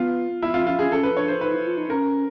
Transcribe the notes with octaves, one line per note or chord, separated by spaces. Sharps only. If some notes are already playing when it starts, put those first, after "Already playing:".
Already playing: B3 F4
B3 E4
C4 F4
C#4 F4
C#4 G#4
C#4 A4
B4
D4 C#5
C5
D#4 B4
E4
F4
D#4
C#4 A#4